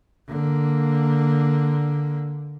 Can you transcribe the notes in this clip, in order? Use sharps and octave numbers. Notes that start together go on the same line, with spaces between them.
D3 A#3